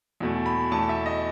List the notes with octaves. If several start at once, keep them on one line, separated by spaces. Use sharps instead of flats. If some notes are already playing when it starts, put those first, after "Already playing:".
E2 B2 A3
B5
E2 B2 A3 A5
E5
D#5